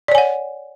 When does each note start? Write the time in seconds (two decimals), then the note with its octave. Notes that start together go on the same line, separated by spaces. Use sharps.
0.08 D5
0.12 C#5
0.15 G#5
0.18 F#5